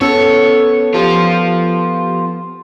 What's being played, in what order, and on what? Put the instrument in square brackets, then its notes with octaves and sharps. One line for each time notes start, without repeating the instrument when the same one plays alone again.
[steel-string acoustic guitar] B3 A4 [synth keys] C#4 E6 C#7 [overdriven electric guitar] C#5
[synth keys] F3 G4 [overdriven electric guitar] F4 C5